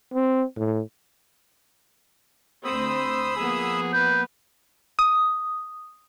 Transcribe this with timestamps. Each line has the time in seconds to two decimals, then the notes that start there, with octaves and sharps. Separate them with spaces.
0.14 C4
0.58 A2
2.64 D2 C4 C5 B5 D#6 E6
3.37 F3 A#3 B3 G#4
3.93 B4 G6
4.99 D#6